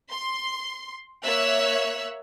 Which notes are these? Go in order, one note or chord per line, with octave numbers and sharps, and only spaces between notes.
C6
A#3 C#5 E5 E6 F#6